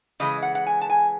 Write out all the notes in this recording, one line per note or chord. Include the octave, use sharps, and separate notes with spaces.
C#3 E3 G#3 D#5
F#5
F#5
G#5
A5
G#5